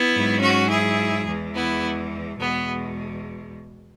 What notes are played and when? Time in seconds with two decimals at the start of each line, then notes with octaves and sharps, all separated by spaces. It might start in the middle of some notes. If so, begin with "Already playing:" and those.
Already playing: B3 E4
0.13 G#2 F#3
0.41 C#4 F#4
0.69 E4 G#4
1.26 E2 E3 G#3
1.55 B3 E4
2.39 E2 B2 G#3 B3